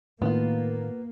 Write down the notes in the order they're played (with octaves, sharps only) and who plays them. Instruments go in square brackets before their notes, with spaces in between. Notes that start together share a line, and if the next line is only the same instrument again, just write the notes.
[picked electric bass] A2 D#3 [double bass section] A#3 [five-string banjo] B3 F4